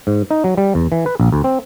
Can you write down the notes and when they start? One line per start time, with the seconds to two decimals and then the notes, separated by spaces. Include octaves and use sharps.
0.07 G#2
0.31 D#4
0.44 F#3
0.57 G3
0.75 E2
0.92 E3
1.06 B4
1.20 A#1
1.32 D2
1.44 C4